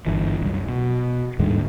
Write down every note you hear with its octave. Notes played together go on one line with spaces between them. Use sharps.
G1 E3
C2 F#2
B2
D#2 G#2 D3 G3